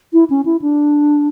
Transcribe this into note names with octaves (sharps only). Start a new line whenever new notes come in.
E4
C#4
E4
D4